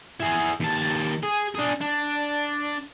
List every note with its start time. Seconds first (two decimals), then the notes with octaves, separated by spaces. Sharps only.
0.20 E4 G#4
0.60 D#2 A5
1.23 G#4
1.55 D4 G#4
1.81 D4